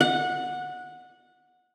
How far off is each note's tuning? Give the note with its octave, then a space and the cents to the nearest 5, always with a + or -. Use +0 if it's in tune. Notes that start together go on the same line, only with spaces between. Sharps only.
F#5 -20